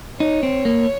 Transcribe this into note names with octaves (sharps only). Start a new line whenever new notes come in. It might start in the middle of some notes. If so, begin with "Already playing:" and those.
D#4 C#5
C4
A#3